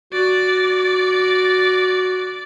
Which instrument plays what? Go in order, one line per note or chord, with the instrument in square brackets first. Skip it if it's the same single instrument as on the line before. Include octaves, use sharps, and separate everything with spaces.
[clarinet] F#4 [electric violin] D5